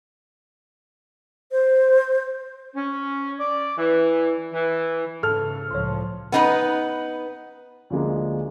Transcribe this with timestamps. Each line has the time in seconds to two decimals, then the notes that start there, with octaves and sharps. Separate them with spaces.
1.52 C5
2.75 C#4
3.39 D5
3.78 E3
4.52 E3
5.23 G#2 C#3 A4 F6
5.71 C#2 A2 F3 C#5 C6
6.32 B3 D#4 B4
7.90 D2 F3 G#3 A#3